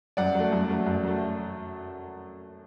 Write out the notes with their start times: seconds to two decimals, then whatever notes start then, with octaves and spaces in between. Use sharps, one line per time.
0.17 F#2 D5 F#5
0.34 F#3 A3
0.52 F#2
0.69 F#3 A3
0.86 F#2
1.03 F#3 A3